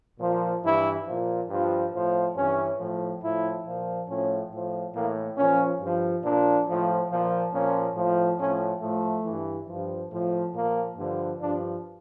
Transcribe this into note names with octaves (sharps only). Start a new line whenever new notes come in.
A#2 F3
G2 E3 E4
A#2 F3
G2 F3
A2 F3
G2 E3 C#4
A2 F3
A2 F3 E4
A#2 F3
A2 F3 C#4
A2 F3
A2 E3 A#3
A#2 F3 C#4
G2 F3
A#2 F3 D4
A2 F3
A#2 F3
A#2 F3 C#4
A2 F3
A2 F3 C#4
A2 F3 A3
G2 E3
G2 F3
A2 F3
A#2 F3 A#3
G2 D3 F3
G2 F3 D4